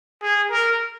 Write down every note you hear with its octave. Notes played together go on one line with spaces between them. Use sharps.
G#4
A#4